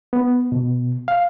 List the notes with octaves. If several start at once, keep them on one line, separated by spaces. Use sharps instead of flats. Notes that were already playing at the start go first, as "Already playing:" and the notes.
B3
B2
F5